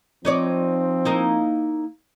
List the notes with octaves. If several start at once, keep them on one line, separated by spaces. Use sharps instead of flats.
F3 C4 D#4 C#5 D5
A#3 D#4 E4